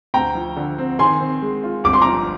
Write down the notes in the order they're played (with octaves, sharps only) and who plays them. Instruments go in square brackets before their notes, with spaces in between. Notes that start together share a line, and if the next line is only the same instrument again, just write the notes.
[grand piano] D2 [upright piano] G5 A#5
[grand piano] F3
D3
C4
[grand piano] D#3 [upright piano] G#5 C6
[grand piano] C4
G#3
F4
[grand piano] G1 [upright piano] D6
[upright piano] C6
[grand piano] F3 [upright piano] A#5 D6